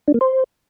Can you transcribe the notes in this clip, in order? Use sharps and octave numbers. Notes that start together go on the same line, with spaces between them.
D4
A#3
C5